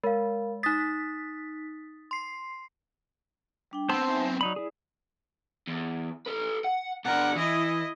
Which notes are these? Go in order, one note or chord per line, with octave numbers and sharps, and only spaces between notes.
G#3 A#4 F5
D#4 D#6 A6 B6
C6 C7
G3 D4 G5
B3 C4 C5 A5 C6 E6
D#4 E5 G#5
F#3
F#3 D#4 D5 B5
E4 G#4
E2
A4 B4
F#5
B2 D4 A#4 F#5
E3 E4 D#5